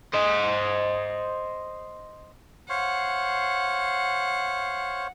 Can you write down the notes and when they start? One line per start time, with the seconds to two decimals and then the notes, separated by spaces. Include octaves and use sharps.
0.14 C5 D#5
2.69 C5 C#5 F5 F#5